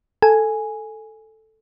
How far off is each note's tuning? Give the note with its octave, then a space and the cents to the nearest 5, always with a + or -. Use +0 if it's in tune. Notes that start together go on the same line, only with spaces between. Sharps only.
A4 +0 G#5 +0